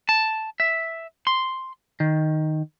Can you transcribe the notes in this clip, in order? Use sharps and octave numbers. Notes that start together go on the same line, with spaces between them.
A5
E5
C6
D#3